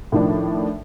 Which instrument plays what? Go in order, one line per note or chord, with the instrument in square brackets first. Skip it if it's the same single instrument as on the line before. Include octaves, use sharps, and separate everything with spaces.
[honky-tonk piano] A2 D#3 F3 D4